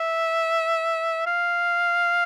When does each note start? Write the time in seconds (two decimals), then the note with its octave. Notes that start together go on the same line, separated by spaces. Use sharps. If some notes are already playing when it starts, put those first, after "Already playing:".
Already playing: E5
1.27 F5